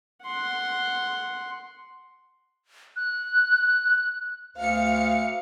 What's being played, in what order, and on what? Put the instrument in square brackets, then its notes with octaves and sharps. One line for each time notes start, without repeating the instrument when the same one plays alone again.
[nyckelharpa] F#5 C6
[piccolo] F#6
[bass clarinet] D2 [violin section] F5 C#7